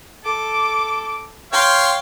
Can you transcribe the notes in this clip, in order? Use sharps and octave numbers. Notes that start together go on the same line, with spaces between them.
A4 D6
C#5 F5 G5 C6